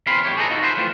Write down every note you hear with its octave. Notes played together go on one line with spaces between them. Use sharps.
E2 C4 F5 B5 C6
F2 A2 G4 C#5
G#4 A4 B4 D#5 A5 A#5
D#4 F4 F#4 A4
F4 B4 C5 E5
E3 F3 A3 C4 F4